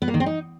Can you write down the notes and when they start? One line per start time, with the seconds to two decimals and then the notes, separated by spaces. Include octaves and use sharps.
0.02 B3
0.08 A#3
0.14 D#3
0.20 C4
0.26 D#4